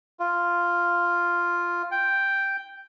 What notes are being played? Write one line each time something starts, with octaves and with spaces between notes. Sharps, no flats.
F4
G5